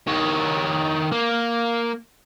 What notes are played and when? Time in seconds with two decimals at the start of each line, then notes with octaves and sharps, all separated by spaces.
0.07 D#3 C#5
1.12 A#3